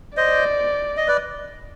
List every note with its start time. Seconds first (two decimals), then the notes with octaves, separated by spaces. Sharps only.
0.17 C5 D5 D#5
0.97 D#5
1.08 B4 D5